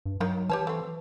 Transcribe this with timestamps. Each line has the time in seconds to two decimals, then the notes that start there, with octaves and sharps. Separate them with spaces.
0.06 G2
0.20 D#3 F#3 A#3
0.50 E3 G4 B4 C#5 A5
0.67 A3 C4